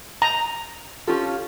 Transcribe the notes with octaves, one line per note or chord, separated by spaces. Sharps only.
A#5
C#4 F4 G4 A4